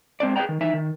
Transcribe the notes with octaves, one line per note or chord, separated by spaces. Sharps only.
G#3 C4 D4 D5
G#4 B4 D5 D#5 G5 A#5
D#3
E3 D#4 E5
D#3